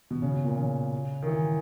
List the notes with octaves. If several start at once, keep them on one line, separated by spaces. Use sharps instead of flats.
B2
C#3
B2
A#2
C#3
D#3
E3